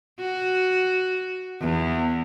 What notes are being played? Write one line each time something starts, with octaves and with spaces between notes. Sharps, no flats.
F#4
E2